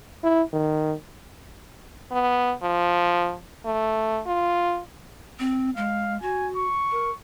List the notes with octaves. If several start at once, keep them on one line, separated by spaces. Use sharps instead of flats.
E4
D#3
B3
F3
A3
F4
C4
G#3 F5
F#4 G#5
C#6
A#4